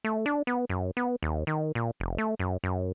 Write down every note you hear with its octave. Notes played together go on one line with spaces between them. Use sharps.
A3
D4
B3
F#2
B3
D#2
D#3
A#2
F1
A3
F#2
F#2